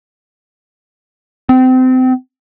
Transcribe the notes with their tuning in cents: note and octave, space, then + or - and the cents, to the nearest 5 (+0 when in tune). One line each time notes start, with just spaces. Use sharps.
C4 -30